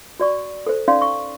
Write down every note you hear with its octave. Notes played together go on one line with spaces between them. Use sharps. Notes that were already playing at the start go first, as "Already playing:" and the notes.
F#4 D5 C#6
A4 C5
C#4 D#4 D5 F5 C6
C#6